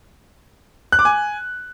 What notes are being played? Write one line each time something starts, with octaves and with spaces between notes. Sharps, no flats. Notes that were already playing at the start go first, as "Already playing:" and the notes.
F#6
D6
G#5